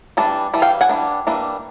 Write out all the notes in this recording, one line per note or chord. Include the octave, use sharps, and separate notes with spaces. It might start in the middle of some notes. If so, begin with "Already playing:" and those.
E3 G3 D4 A5
E3 G3 A5
F5 G5
F#5 G#5
E3 G3 A#3 D4
E3 G3 A#3 D4